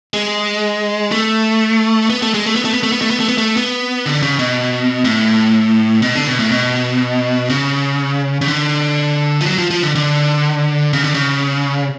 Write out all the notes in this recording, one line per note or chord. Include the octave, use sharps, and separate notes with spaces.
G#3
A3
B3
A3
G#3
A3
B3
A3
B3
A3
B3
A3
B3
A3
B3
A3
B3
D3
C#3
B2
A2
B2
D3
B2
A2
B2
C#3
C#3
D3
F3
F#3
F3
F3
D3
D3
C#3
D3
C#3